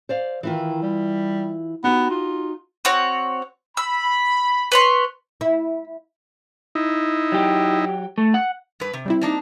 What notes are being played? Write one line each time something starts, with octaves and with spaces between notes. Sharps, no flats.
C5 D5 F5
D#3 E3 E4 F4
G3
B3 D#4 F#4 G4
F4
C4 F#4 C#5
B5 E6
B4 C#5 C6
E4
D#4 E4
F#3 G4
A3
F#5
G2 B4
C3
G3 C4 E4
A#3 D4 D#4